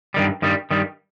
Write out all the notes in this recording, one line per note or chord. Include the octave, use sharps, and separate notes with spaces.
G2 D#3 G3
G2 D#3 G3
G2 D#3 G3